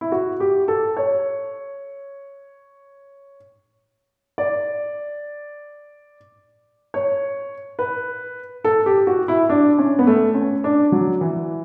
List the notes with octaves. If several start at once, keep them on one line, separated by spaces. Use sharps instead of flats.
E4
F#4
G4
A4
C#5
D5
C#5
B4
A4
G4
F#4
E4
D4
C#4
B3
A3
C#4
D4
F#3
E3